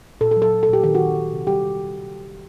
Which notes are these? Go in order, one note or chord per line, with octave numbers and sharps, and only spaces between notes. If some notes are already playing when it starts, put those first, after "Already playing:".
A#2 A4
A4
F#3
A4
A#2
A4
A#2 G4
D#3 G4
F#4
D#3
D#3
C3
G3 G4